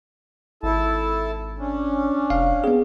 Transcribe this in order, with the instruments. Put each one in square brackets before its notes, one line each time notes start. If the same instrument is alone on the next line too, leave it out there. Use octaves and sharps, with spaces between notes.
[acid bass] G#1 [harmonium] E4 A4 A5
[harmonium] C#4 D4
[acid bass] F1 [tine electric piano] F5
[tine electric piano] B3 G#4 [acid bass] C4